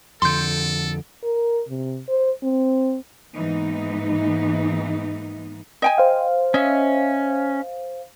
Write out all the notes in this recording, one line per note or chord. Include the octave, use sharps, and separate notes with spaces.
F2 D3 A4 C6 G6
A#4
C3
C5
C4
G#2 E3 A#3 B3 D#4
D#5 G5 G#5
C5 F5
C#4 D#5 E5